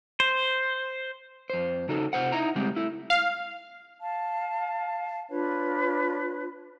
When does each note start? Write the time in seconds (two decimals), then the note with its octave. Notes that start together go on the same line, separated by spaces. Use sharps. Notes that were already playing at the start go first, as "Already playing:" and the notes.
0.20 C5
1.50 F2 C5
1.88 C#3 D#4 F#4 A4
2.13 C3 C5 F#5
2.32 D#4 E4 A#5
2.55 C#3 G3 G#3 C4 G4
2.76 A3 E4
3.10 F5
4.00 F5 A5
5.30 D4 F4 B4 C#5